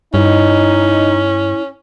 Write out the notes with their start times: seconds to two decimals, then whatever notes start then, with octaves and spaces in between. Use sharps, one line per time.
0.14 G2 C#4 D#4 E4